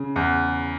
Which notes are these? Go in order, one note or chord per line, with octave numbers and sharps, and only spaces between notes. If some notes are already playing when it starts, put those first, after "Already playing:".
Already playing: C#3
E2